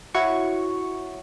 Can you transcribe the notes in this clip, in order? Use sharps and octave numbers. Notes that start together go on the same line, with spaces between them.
E4 F#4 C#5 C#6